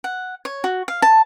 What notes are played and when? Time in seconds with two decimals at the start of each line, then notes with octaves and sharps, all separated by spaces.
0.04 F#5
0.45 C#5
0.64 F#4
0.88 F5
1.02 A5